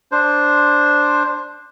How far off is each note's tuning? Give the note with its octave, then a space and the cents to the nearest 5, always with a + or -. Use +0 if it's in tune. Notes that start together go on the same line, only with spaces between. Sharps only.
D4 +0 C5 +0